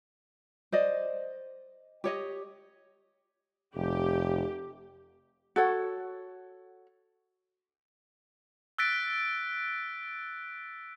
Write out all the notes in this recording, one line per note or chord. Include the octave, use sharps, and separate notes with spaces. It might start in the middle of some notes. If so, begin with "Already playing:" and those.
C5 D5 D#5
G4 C#5 D#5
F1 G4
F#4 A4 C#5 F#5
E6 F#6 A6 B6 D7